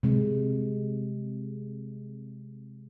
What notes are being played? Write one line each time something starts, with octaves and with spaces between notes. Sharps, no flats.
C3 G#3